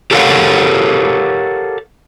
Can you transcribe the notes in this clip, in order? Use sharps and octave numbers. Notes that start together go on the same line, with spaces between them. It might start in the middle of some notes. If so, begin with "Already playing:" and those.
G4 A4 A#4 C#5 F5 F#5